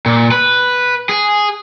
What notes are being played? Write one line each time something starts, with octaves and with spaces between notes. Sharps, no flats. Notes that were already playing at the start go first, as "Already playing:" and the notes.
A#2
B4
G#4